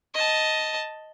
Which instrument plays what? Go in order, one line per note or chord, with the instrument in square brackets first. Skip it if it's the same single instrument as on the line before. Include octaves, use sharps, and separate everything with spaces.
[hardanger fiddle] D#5 A5